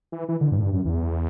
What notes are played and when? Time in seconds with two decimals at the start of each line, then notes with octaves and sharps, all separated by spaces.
0.12 E3
0.29 E3
0.41 D3
0.52 G2
0.58 A2
0.62 G2
0.73 F#2
0.85 E2